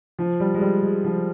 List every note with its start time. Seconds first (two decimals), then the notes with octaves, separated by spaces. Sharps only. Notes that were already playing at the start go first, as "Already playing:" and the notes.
0.19 F3
0.40 G3
0.54 G#3
0.61 G3
0.82 G#3
1.05 F3